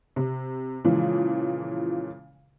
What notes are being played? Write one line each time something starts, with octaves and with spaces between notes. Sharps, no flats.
C3
A#2 C#3 E3 F3 G#3